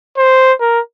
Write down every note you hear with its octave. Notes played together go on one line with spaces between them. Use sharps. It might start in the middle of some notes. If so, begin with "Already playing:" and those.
C5
A#4